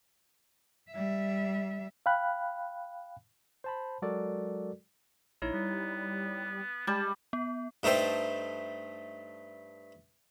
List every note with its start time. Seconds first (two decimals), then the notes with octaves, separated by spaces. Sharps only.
0.91 G3 E5
2.06 F5 G5 B5 F#6
3.64 C5 A5 B5
4.02 F#3 G#3 F#4 A4 A#4 D5
5.42 A#1 D#4 E4 C#5
5.54 G3 B3
6.87 G3 G#3 A5 B5
7.33 B3
7.83 G2 A3 D#4 A4 C5 G5